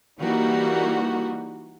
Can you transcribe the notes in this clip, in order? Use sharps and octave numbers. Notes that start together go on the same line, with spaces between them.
E3 G3 A#3 D#4 F#4